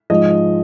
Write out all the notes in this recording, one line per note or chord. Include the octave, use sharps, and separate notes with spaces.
G#2 F3 G#3 D#5